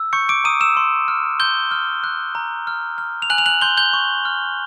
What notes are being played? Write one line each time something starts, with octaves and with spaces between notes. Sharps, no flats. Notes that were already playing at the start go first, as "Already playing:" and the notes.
Already playing: E6
C#6 G6 C#7
D6 D7
A#5 D#6 D#7
E6 E7
C6
F6
C6 G6 G7
F6
F#6
A#5
F6
F6
F7
G#5 F#6 F#7
F7
F#6 F#7
C6 G6 G7
G6 G7
C#6
F6